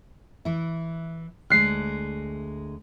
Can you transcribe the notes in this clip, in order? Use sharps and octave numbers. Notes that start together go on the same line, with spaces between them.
E3 E4
D2 G#3 F#6 C7